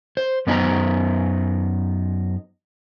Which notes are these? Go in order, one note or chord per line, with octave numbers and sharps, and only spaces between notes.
C5
F#2 B3 D#4 G4 C5 A#5